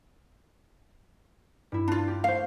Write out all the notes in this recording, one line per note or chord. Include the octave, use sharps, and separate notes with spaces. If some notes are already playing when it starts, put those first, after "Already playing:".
G2 E4
D4 F4
G4
A3 C5 F5